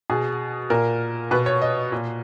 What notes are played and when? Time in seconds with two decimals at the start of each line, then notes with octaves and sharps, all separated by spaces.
0.10 B2 G#4
0.70 A#2 A#4
1.31 B2 B4
1.46 C#5
1.62 D#5
1.92 A#2